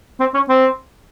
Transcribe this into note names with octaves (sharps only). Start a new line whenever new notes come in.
C4
C#4
C4